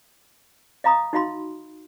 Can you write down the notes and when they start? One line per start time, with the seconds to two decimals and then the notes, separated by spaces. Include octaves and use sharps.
0.84 D#5 F5 A#5 B5 D#6
1.13 D#4 F#4 D#5 F5 B5 C6